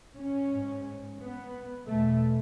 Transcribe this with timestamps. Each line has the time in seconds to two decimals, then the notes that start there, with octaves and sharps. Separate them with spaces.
0.16 C#4
0.50 G#2
1.19 B3
1.87 E2 B2 A3